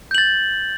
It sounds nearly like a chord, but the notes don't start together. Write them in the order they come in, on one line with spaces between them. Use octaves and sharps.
G6 F#7 A6